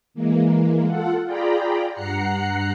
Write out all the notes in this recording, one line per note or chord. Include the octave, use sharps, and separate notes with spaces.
E3 G#3 A#3
F4 A4 F#5
F4 G#4 D5 G5 A#5 B5
G2 F#5 A#5 F#6 C7 C#7